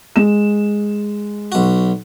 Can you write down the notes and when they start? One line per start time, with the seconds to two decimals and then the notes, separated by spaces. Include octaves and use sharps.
0.16 G#3 E7
1.52 B1 F#4